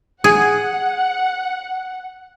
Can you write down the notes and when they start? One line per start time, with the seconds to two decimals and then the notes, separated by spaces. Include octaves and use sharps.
0.24 G#4 F#5